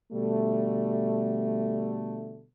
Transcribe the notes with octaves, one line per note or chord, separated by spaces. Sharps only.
B2 D3 G3 A3